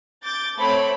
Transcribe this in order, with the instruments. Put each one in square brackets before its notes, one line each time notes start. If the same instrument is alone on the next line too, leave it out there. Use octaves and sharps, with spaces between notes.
[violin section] D6 G6 A6
A3 C4 C#5 B5 D7